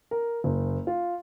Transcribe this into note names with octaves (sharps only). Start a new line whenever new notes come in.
A#4
F#1
F4